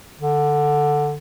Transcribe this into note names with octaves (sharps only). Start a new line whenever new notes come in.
D3